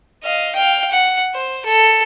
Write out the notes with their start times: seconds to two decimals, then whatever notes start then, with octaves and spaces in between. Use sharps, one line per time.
0.24 D#5 F5
0.56 F5 G5
0.91 F#5
1.34 C5
1.66 A4